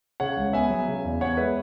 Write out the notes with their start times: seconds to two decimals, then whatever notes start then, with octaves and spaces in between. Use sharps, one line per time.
0.20 C#3 C#5 F#5
0.37 C#2
0.53 B3 E5 G#5
0.70 F#3
0.88 C#3
1.04 E2
1.21 B3 C#5 F#5
1.37 G#3 B4 E5